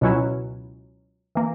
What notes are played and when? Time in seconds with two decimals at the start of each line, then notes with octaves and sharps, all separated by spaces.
0.01 C#2 B2 F#3 C#4 E4
1.35 E3 A#3